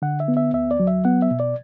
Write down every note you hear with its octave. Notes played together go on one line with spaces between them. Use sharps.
D3 F#5
E5
B3
E5
D2 E5
D5
F#3
E5
B3 F#5
E5
B2
D5